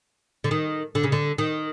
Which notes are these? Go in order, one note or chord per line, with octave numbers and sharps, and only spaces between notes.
D3
D#3
D3
C#3
D3
D#3